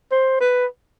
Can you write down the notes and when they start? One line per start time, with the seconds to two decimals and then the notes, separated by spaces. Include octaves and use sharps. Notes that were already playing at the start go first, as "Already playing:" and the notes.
0.12 C5
0.41 B4